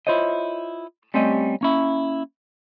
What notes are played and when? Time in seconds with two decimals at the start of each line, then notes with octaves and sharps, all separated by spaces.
0.07 E4 F4 C5 C#5 D#5
1.14 G3 A3 C4 C#4 G4 D#5
1.61 A#3 C#4 E4